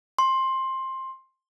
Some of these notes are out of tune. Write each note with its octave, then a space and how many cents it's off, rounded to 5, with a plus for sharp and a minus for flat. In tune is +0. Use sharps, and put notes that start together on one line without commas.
C6 +15